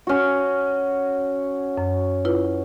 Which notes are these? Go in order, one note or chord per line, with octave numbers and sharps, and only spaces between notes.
C#4 F#4
F#2
E4 F4 B4